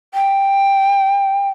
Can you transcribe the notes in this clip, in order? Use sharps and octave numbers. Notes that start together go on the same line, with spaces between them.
G5